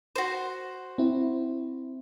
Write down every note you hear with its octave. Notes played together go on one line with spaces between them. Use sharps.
F#4 C5
C4 E4